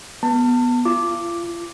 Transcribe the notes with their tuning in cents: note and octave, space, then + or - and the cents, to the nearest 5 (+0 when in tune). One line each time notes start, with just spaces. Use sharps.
B3 -10 A5 +30
F4 -35 D6 +0